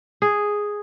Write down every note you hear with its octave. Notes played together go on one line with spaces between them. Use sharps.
G#4